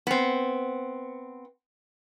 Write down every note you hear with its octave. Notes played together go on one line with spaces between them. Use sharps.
B3 C4